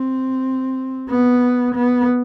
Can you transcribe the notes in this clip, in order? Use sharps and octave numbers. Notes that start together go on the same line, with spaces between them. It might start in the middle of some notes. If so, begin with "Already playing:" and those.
Already playing: C4
B3
B3